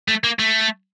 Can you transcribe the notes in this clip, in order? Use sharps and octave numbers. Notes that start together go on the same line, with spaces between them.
A3
A#3
A3